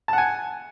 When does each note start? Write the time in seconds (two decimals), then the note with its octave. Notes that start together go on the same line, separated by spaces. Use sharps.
0.08 A5
0.13 F#5
0.18 G#5